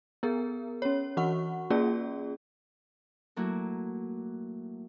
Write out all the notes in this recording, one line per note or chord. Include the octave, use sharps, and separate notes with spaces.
B3 G#4 A#4
C#4 C#5
E3 F#4 F#5 C#6
A#3 C#4 F4 G#4 D5
F#3 A3 A#3 E4 F#4